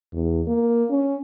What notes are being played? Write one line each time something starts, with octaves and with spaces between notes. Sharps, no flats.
E2
A#3
C#4